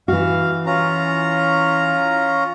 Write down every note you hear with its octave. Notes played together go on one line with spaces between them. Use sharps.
E3 F#4 F5
C#4 F4 A#5